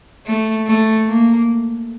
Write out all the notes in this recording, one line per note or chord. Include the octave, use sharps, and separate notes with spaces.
A3
A3
A#3